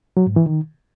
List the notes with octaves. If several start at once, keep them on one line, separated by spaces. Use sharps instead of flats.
F#3
G#2
E3
D#3